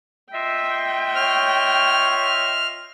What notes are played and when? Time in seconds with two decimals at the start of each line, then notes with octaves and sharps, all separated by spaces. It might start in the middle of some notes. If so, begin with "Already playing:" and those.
0.33 F4 D#5 E5 G5
1.15 C#5 F6